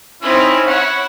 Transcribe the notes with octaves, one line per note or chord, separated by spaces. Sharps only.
C4 C#4 D#4 E4
E4 C#5 F#5